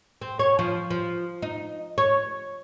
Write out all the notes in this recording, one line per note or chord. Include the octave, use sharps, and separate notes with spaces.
C4
C#5
F3
F3
D#4
C#5